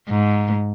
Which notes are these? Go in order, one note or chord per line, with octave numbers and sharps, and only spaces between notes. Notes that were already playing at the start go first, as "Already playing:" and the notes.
G#2